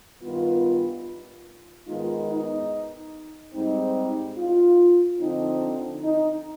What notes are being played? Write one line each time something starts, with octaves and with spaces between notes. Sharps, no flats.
G2 D#3 B3 F4
G#2 D#3 G#3 B3 D#4 F4
D#4
G#2 G3 C4 D#4
F4
D3 F3 C4 D#4
D#4